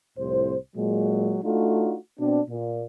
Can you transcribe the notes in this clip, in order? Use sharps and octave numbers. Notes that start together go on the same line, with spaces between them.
C2 F2 A2 C5
A#2 F#3 G#3
A3 D4 D#4 F4 F#4
B2 C4 D4
A#2